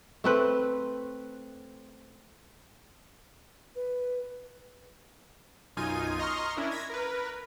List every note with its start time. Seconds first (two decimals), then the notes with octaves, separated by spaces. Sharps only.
0.24 A3 C4 B4
3.76 B4
5.77 B1 F#2 D#4 F4 G#5 D#7
6.19 D#5 A#5 C6 C#6 F6
6.57 C#4 D4 E4 A#4
6.71 G#6 A#6 B6
6.90 A#4 B4